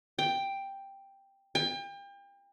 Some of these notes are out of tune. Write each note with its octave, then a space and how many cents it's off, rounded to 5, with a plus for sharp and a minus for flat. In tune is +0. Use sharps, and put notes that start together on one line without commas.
G5 +5
G5 +35